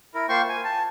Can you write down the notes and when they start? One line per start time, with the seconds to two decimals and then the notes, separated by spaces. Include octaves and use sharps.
0.15 E4 A#4
0.29 A#3 F4 C5 G5 C6 C#6
0.49 G#5
0.64 A5